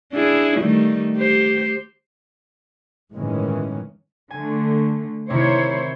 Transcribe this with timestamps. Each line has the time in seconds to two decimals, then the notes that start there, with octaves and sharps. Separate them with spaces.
0.13 D4 E4 G#4
0.61 D#3 G3 A3
1.17 G4 C5
3.13 G1 A2 D#3 E3 G#3 C#4
4.31 D3 A3 G#5
5.30 C3 D#3 E4 C5 C#5